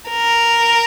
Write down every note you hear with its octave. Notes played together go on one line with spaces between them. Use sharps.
A#4